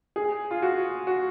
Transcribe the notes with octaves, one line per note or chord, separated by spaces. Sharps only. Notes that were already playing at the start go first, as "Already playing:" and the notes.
G#4
F4
F#4
F#4